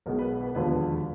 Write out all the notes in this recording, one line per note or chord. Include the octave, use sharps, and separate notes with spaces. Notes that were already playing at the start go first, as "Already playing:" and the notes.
B1 B2 G#3 A#4
B4
B4
E1 D#2 D3 F3 B4